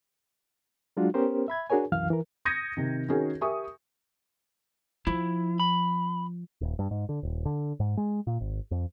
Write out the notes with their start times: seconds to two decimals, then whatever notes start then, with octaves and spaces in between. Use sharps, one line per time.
0.97 F#3 G#3 D4 F4 F#4
1.14 B3 C#4 G4 A#4 C5
1.48 E5 B5 G#6
1.70 D4 F#4 G#4 A#4 C#5 G#5
1.92 C2 F#2 E3 F5 F6
2.10 E3 A#4
2.45 D#6 G6 G#6 A#6 C#7 D#7
2.77 C3 D#3
3.09 D#3 C#4 F#4 G#4 A#4
3.41 G4 A#4 E5 G#5 C#6 D#6
5.07 F3 E4
5.60 B5
6.61 D#1
6.79 G2
6.91 G#2
7.09 D3
7.23 D#1
7.45 D3
7.80 G#2
7.97 G#3
8.27 A#2
8.41 G#1
8.71 F2